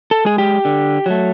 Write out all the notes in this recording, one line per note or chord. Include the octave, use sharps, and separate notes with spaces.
A4
G#3 G#4
G4
D3
F#3 A3